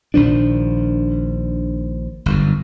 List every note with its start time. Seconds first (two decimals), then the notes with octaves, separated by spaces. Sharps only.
0.14 A#1 D#3 F3 D4
2.26 G1 F#2